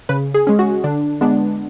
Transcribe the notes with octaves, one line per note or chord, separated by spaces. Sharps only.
C#3 B4
G#4
G#3 C#4
F#4
D3 D4
G#3 B3 D4